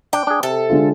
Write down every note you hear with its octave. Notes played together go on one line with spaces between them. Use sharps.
D4 G5
D4 G#4
C3 A4
D3 G#3 F4